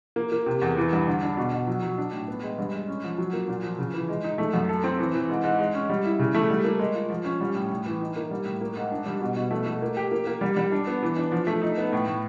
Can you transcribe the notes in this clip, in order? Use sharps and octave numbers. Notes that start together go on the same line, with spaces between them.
A#3
A#3
C3
E2
E3
G2
D3
D4
B2
B2
F#3
F#3
D4
A2
B3
G#3
G2
G#3
C#4
F3
F#3
A#3
A#2
F3
C#3
E3
G#3
D#4
A3
F#2
A4
C4
E3
E3
G#2
G#2
G#3
C#4
G3
E4
C#3
A3
G3
A#3
G#3
F4
F3
C#4
G3
A2
A2
E3
D#4
A#3
G3
A2
A#3
G#2
D4
G3
B2
B2
A3
A3
A#3
G4
A#3
A#3
G3
G3
D4
B3
E3
D4
F3
A3
D#4
B3
A2
A2